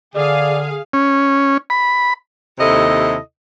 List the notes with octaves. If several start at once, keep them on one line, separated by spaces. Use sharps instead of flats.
D3 G#4 D5 F5
C#4
B5
D#2 C3 E4 A4 D#5